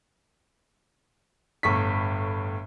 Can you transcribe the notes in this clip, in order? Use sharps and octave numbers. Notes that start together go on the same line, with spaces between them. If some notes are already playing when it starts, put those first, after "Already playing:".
G1 A2 C#6 B6